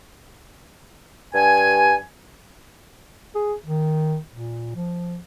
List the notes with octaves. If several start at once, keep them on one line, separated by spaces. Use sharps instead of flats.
G2 G#5
G#4
D#3
A#2
F3